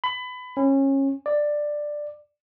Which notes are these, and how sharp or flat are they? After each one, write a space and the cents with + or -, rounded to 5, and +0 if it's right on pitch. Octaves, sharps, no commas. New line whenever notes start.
B5 +25
C#4 -25
D5 +10